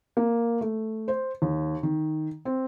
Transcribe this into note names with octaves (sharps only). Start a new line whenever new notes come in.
A#3
A3
C5
D#2
D#3
C4